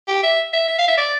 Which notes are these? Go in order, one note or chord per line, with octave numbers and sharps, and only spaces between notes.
G4
E5
E5
E5
F5
E5
D5